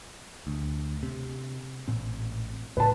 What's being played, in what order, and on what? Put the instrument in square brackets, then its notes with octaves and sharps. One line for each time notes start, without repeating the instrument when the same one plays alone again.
[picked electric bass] D2
C3
A1 A#2 C4
[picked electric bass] C#2 A2 [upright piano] B4 A5